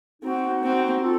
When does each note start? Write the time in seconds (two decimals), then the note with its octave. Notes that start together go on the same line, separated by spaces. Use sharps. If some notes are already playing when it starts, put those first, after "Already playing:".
0.22 C4 D#4 F#4
0.63 C4
1.02 F4 A4